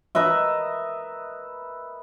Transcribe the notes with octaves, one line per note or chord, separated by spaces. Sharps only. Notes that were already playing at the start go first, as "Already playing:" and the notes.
A#4 B4 D#5 E5